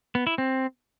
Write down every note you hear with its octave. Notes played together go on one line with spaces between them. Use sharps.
B3
E4
C4